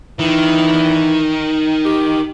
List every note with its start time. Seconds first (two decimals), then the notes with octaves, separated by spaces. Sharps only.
0.19 D#3 E3
1.85 G4